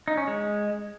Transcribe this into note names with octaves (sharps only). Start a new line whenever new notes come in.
D#4
C#4
G#3